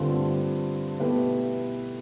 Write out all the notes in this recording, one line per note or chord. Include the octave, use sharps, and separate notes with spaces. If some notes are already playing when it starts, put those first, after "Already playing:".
Already playing: G2 D3 A3 C4 F4
B2 A3 E4 G4 B4